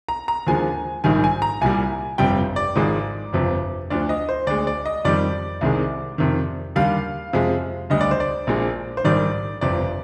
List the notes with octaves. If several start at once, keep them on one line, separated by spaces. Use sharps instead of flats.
A#5
A#5
D#2 D3 F3 G#3 G#5
A#1 G#2 D#3 G3 G#5
G#5
A#5
C2 A#2 G3 G#5
G1 F2 C3 G3 G5
D5
G#1 G#2 F3 G#3
G1 F2 C3 F3
D2 D3 F3 D5
D#5
C5
D2 D3 G#3 D5
D5
D#5
F2 D#3 G3 D5
C2 C3 D#3 G#3
F2 C3 D#3
D#2 D3 G3 F5
F2 C3 F3 G#3
D2 D3 G3 D#5
D5
C5
D5
A#1 A#2 F3 G#3
C5
A#1 G#2 D#3 G3 D5
G1 F2 C3 D5